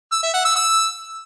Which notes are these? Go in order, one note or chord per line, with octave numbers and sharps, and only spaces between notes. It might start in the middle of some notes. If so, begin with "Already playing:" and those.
E6
E5
F#5
E6
E6